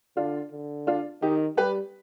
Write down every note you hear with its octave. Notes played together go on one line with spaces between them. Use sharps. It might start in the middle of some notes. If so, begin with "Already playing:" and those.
D3 D4 F4
D3
D4 F4
D#3 D#4 G4
G3 G4 B4